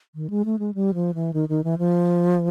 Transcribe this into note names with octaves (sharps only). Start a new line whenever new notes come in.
D#3
G#3
A3
G#3
G3
F3
E3
D#3
D#3
E3
F3